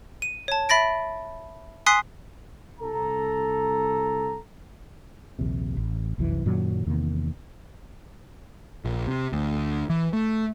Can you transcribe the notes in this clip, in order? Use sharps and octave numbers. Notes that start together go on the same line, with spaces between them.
D#7
C#5 A5
E5 B5 A6 A#6 D7
G#5 C6 D#6 F#6 B6 C7
C2 A4 A#5
A#1 D#2 C3
A1
F1 C2 F#2 E3
F#2 A#2 D#3 F#3
E2 C3 D#3 A#3
A#1
C3
D2
E3
A3